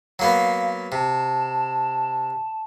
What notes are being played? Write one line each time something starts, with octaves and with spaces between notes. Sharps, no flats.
F#3 A#3 B3 F5
C3 A5